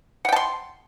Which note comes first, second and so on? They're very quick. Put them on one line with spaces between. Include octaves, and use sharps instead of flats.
F#5 G5 A5 C6